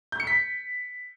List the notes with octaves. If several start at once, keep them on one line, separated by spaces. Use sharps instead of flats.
G6
C#7
B6